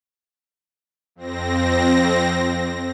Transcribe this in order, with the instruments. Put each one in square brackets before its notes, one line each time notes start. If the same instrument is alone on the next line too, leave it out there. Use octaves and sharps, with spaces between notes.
[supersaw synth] F2 C4 A#6